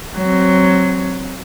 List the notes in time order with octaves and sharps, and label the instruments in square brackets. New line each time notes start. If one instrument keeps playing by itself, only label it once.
[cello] F#3 C4